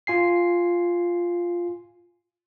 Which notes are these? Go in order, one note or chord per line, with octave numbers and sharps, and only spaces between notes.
F4 G#5 C7